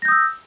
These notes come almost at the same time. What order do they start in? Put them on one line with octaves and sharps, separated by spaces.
A#6 G6 D#6 E6